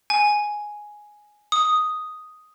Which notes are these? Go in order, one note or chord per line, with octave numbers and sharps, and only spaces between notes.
G#5
D#6